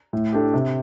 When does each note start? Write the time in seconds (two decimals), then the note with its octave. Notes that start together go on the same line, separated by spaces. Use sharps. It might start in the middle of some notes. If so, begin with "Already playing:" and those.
0.13 A2
0.32 A3 D4 G4
0.53 C3